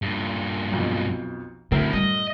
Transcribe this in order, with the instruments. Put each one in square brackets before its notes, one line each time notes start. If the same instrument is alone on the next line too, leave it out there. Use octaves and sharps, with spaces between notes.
[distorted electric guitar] G2 A#2
[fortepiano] B1 F2 B2
[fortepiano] F#2 A2 A#4 [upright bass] D3 [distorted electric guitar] C4 E4
[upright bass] G3 [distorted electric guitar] D#5